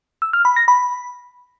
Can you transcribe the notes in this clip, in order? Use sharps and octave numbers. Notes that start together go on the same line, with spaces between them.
E6
F6
B5
A#6
B5